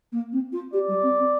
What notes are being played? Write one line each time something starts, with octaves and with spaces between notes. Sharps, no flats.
A#3
C4
F4
G4 D5
G3
C4
C4